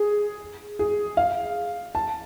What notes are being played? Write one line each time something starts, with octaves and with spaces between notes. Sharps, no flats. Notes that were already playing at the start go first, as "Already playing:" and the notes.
Already playing: G#4
G#4
F5
A5